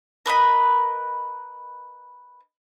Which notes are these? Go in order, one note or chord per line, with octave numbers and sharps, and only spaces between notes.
A#4 B4 D#5 B5